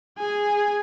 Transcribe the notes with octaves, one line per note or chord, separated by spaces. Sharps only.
G#4 G#5